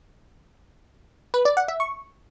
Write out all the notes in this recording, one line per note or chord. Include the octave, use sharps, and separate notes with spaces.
B4
D5
F#5
E5
C#6